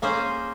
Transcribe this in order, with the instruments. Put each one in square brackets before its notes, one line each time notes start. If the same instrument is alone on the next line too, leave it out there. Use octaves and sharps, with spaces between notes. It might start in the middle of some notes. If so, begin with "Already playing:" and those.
[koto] A#3 C#4 G#4 C5